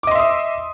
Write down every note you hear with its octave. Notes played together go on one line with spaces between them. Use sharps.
D#5 E5 C6 D6 D#6